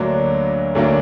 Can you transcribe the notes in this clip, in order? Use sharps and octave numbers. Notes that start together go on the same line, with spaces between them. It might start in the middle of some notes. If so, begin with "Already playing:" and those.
Already playing: D2 D3 F#3 A#3 D4
D2 D3 F#3 A#3 D4